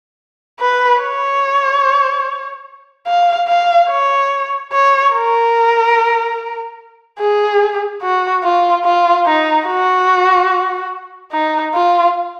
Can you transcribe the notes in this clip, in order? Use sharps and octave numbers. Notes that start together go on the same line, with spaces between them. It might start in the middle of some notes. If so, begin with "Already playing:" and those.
B4
C#5
F5
F5
C#5
C#5
A#4
G#4
F#4
F4
F4
D#4
F#4
D#4
F4